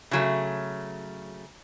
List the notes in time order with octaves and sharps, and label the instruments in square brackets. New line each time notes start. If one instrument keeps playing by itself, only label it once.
[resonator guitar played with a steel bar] C#3 F#3 A3